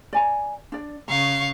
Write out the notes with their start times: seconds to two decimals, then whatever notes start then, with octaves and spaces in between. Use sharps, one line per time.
0.13 D5 G#5 A#5
0.72 D4 D5
1.08 C#3 F5 A#5 C#6